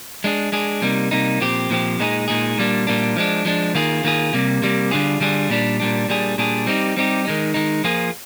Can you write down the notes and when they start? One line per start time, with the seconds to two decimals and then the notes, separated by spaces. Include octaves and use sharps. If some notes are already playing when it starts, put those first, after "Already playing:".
0.24 G#3 D4 G#4
0.52 G#3 D4 G#4
0.82 C3 G3 A#3 D#4
1.11 C3 G3 A#3 D#4
1.41 A#2 F3 C4 G4
1.70 A#2 F3 C4 G4
2.00 A#2 G#3 D#4 G#4
2.28 A#2 G#3 D#4 G#4
2.58 A#2 G3 A#3 D4
2.87 A#2 G3 A#3 D4
3.16 F3 G#3 D4
3.45 F3 G#3 D4
3.75 D#3 A#3 F4 G#4
4.04 D#3 A#3 F4 G#4
4.33 C3 G3 A#3
4.62 C3 G3 A#3
4.91 D3 G3 D4 F4 G#4
5.20 D3 G3 D4 F4 G#4
5.50 A#2 G3 D4
5.80 A#2 G3 D4
6.09 A#2 G3 D4 G#4
6.38 A#2 G3 D4 G#4
6.66 G3 C4 D#4 G4
6.97 G3 C4 D#4 G4
7.25 D#3 G#3 D#4
7.54 D#3 G#3 D#4
7.84 F3 A#3 F4 G#4